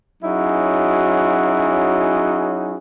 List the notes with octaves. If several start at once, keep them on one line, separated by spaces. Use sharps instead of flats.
F#3 C#4 D#4 E4 F#4 G#4